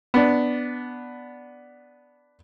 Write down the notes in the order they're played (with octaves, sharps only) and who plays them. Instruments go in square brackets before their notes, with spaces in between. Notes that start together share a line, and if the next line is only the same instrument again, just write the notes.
[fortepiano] B3 D4